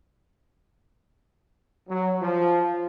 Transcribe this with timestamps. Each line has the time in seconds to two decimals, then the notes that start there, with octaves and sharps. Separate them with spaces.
1.89 F#3
2.22 F3